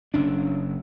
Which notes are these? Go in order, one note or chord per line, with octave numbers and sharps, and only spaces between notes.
F#1 C#4 D4